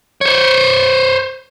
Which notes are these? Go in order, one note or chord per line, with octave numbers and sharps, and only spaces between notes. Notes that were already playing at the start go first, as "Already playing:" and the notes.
C5 C#5